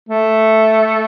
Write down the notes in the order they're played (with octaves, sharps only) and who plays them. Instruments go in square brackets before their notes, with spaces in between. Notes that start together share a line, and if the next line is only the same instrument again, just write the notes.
[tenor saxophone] A3